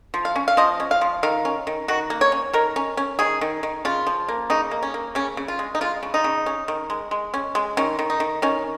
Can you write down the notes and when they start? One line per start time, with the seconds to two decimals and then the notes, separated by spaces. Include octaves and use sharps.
0.14 F3
0.25 F5
0.36 C#4
0.48 F5
0.57 F3 D#5
0.80 C#4
0.91 F5
1.01 F3
1.23 D#3 F5
1.45 C#4
1.67 D#3
1.88 D#3 F#4
2.10 A#3
2.21 C#5
2.32 C#4
2.53 D#3 A#4
2.76 C#4
2.97 C#4
3.19 D#3 G#4
3.41 D#3
3.63 D#3
3.85 C#3 F4
4.07 F3
4.29 A#3
4.50 C#3 D#4
4.71 A#3
4.83 C#4
4.94 A#3
5.15 C#3 C#4
5.37 C#3
5.48 F4
5.59 G#3
5.75 D#4
5.81 G#3 F4
6.03 C#3
6.14 D#4
6.24 C#3
6.46 C#4
6.68 D#3
6.90 G#3
7.11 G#3
7.34 C#4
7.55 G#3
7.77 D#3 C#4
7.99 D#3
8.10 D#4
8.20 D#3
8.42 D#3 C#4